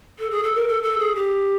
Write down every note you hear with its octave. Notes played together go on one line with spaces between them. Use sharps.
A4
G#4
A4
A#4
A4
A4
G#4
G4